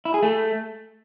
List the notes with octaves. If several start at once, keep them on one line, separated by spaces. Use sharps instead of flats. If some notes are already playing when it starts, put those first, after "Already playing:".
E4
G#4
A3